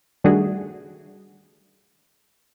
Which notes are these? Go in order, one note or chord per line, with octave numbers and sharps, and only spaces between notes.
D#3 G3 A3 D4 F#4 G#4